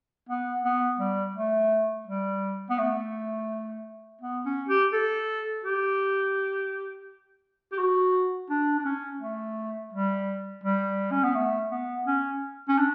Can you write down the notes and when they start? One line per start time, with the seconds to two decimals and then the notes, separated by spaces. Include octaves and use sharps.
0.29 B3
0.65 B3
1.00 G3
1.35 A3
2.07 G3
2.70 B3
2.79 A3
4.22 B3
4.46 C#4
4.69 G4
4.93 A4
5.64 G4
7.73 G4
7.79 F#4
8.50 D4
8.78 D4
8.85 C#4
9.22 A3
9.93 G3
10.64 G3
11.11 C#4
11.24 B3
11.35 A3
11.71 B3
12.07 C#4
12.68 C#4
12.79 D4